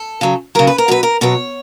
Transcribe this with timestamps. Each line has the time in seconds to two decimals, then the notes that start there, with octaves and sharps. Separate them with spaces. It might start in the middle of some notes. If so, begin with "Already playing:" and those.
Already playing: A4
0.21 C#3 F#3
0.55 C#3 F#3 A#4
0.67 B4
0.78 A#4
0.88 B2 F#3 B4
1.03 A#4
1.21 B2 F#3 C#5